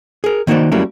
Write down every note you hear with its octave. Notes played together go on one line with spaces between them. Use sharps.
G#4 A#4
D#3 A#3 D#4 F#4 C5 D5
F#3 G3 A3 A#3 C#4 E4